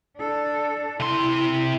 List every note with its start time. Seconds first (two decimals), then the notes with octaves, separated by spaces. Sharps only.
0.17 D4 A4
1.00 C3 E4 C6